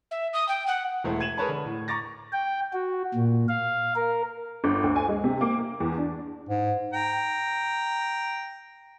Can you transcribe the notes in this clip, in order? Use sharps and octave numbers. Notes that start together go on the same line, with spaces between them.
E5
D#6
G5
F#5
E1 E3 G#3 A3 E4 C5
G#6 D#7 E7 F#7
G#4 A#4 B4 C#5 A5 B5
D3
A2
A#5 C#6 D6 A6 A#6
G5
F#4
A#2
F5
A#4
G1
D2
G#5
G#3
C3
A#3
A#3
E2
D4
G#2
G5 A#5